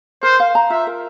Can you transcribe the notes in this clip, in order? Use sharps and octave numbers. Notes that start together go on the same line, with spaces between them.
A#4 C5
F5
A#5
F4 E5
A#4